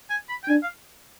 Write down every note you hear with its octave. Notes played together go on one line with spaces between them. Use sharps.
G#5
B5
G5
D4 G#5
F5